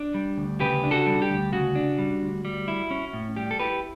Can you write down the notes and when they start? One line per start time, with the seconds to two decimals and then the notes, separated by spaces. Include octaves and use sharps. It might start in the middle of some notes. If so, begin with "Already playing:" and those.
Already playing: D4
0.14 G3
0.37 D2
0.60 C#3 G4 B4
0.84 D4
0.91 F#4 A4
1.07 G3
1.22 G4
1.30 D2
1.53 C#3 F#4
1.76 D4
1.99 G3
2.22 D2
2.45 G3
2.68 E4
2.91 C#4
3.13 A2
3.36 G3 G4
3.51 A4
3.60 E4 G4 B4